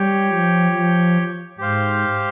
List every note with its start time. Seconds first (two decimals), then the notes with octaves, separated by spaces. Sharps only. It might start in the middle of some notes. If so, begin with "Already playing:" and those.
Already playing: G3 G4 C#5 G5
0.28 F3
0.71 F3
1.58 G#2 G4 C5 F5